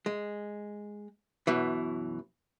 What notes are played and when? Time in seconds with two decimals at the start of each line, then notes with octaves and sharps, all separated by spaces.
0.06 G#3
1.47 F#2 B2 E3